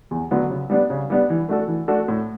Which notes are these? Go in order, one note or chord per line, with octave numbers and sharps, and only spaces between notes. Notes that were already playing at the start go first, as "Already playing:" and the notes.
E2
D3 F#3 B3
C#3
G3 B3 D4
C#3
G3 B3 D4
E3
A3 D4 F#4 A4
E3
A3 D4 F#4 A4
A2